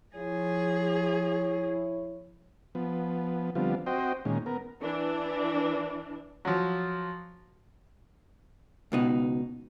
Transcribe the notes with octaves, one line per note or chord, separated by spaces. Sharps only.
F3 E4 G#4 C#5
F3 B3
D3 F3 G3 B3 C4 F4
C4 F#4 C5 D#5 G5
A#2 D#3 G#3 C#4
B3 A#4
E3 D4
F3 F#3
C#2 B2 D#4